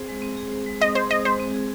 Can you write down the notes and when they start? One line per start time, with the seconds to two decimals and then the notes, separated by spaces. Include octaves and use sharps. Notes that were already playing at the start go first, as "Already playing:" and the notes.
Already playing: C4 G#4 C5
0.08 G#3
0.22 C4
0.37 G#4
0.52 C5
0.66 G#3
0.81 C4 D#5
0.95 G#4 C5
1.10 C5 D#5
1.25 G#3 C5
1.40 C4
1.54 G#4